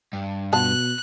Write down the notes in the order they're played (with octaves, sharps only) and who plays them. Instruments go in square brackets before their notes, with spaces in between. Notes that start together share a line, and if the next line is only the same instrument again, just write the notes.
[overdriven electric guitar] G2
[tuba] B2 [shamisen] B3 F4 A5 [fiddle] F#6